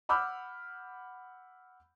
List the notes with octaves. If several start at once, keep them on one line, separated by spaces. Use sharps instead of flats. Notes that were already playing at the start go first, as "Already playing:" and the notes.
F#5 B5 D6 E6 F6 G6